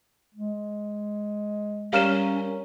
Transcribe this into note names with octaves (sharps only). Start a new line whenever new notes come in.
G#3
G3 C#4 A#4 C#5 F5 F6 E7